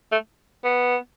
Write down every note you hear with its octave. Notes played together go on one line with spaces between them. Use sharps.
A3
B3